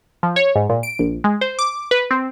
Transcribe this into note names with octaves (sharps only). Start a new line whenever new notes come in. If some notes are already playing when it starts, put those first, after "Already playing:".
F3
C#5
G#2
A#2
D7
A#1
G#3
C5
D6
B4
C4